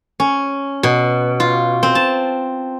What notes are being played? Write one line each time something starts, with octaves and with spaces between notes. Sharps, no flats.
C#4
B2
F4
C4
A5